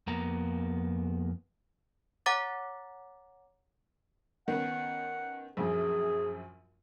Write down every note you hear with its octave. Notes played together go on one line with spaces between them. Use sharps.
F2 A#3 B3 A#5
C#5 F#5 A#5 D6 A6
D#3 B3 C#4 F#5
A#1 F#2 G#4